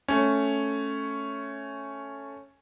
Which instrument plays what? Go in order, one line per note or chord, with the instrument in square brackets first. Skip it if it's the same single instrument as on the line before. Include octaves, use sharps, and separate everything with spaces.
[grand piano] A3 C#4